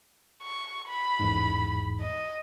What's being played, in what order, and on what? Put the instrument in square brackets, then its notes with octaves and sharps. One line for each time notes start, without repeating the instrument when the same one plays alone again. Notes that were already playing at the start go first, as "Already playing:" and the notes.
[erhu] C#6
B5
[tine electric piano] A1 E2 G#2
[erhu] D#5